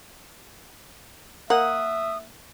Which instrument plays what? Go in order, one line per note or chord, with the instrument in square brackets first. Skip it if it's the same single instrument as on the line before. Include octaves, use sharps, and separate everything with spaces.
[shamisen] A#3 [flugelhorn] E5 [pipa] F#5 [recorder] D#6